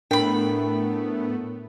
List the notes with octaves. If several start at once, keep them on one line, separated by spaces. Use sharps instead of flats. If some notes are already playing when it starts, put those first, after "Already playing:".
A2 A3 B3 D4 A#4 G5 B5